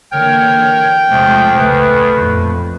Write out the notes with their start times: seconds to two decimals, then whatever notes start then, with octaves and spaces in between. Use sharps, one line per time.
0.12 D3 E3 A#3 A#4 C#5 G5
1.09 E2 C3 F3 G#3 A3
1.57 F#1 C#2 A2 A3 B4
2.12 A#1 F2